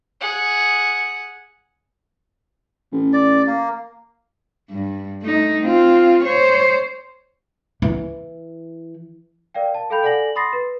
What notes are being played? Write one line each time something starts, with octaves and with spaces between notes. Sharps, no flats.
G#4 F#5
A1
D5
A#3
G2
A3 D#4
C4 F4
C5 C#5
E3
A#4 D5 F5 G5
A5
A4 F5 G5 B5 G6 F7
A4 D5 F#5 G#5 A#6 F#7
B5 C6 D#6 A6 A#6 C7
B4